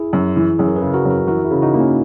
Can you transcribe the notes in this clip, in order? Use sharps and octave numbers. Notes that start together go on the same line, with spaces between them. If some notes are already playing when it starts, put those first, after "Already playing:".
Already playing: E4 G#4
F#2
E3
F#2 G#4
A#4
G#4 B4
C#3
F#4 A#4
F#2
F#4 A#4
E3 F#4 A#4
E4 G#4
C#3
D#4 F#4
A#3
C#4 E4